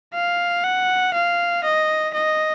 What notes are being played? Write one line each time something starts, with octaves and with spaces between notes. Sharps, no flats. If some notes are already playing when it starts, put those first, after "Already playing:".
F5
F#5
F5
D#5
D#5